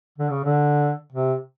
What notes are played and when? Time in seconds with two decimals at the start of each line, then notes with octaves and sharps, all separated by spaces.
0.18 D3
0.31 C#3
0.44 D3
1.13 C3